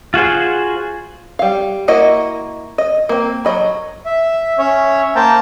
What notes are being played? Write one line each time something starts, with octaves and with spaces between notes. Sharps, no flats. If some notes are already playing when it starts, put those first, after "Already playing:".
F4 F#4 G#4 C5
G3 F5
A#3 E4 F#4 D#5
D#5
A#3 C4
F#3 D#5 B5
E5
C#4 C#5 E5
A#3 C5 G5 A5 A#5